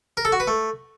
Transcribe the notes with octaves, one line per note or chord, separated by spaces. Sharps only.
A#4
A4
F#4
B4
A3